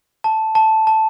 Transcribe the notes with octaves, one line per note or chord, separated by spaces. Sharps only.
A5
A5
A5